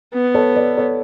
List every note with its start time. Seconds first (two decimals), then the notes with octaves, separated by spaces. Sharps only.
0.14 B3
0.35 A4 C#5
0.56 B4 D5
0.77 A4 C#5